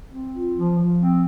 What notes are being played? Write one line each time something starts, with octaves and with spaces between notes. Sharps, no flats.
C4
F4
F3
F3
C4